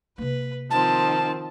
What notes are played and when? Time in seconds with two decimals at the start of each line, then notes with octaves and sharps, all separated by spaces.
0.18 C3 A#3 B4
0.71 D#3 F3 C4 A5